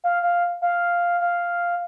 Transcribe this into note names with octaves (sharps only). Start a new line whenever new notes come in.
F5
F5
F5
F5